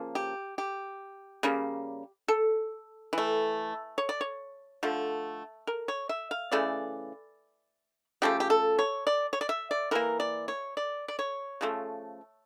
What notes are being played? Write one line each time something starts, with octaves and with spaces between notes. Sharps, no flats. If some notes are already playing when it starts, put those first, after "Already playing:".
Already playing: C#3 F3 A#3
G4
G4
C#3 G3 A#3
A4
E3 A3
C#5
D5
C#5
D3 F3 A3
A#4
C#5
E5
F5
C#3 E3 A3 D5
C#3 F3 A3 G4
G4
A4
C#5
D5
C#5
D5
E5
D5
E3 A#3 A#4
D5
C#5
D5
D5
C#5
C#3 F3 A3